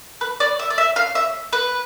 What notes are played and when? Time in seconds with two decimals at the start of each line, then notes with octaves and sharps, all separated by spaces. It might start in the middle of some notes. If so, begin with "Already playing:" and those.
0.21 B4
0.40 D5
0.59 E5
0.70 D5
0.78 E5
0.96 F5
1.15 E5
1.53 B4